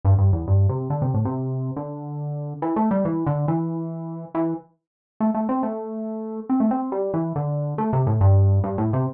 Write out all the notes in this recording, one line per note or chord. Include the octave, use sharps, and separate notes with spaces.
G2
G2
E2
G2
C3
D3
C3
A2
C3
D3
E3
A3
G3
E3
D3
E3
E3
A3
A3
C4
A3
C4
A3
C4
G3
E3
D3
A3
C3
A2
G2
G2
A2
C3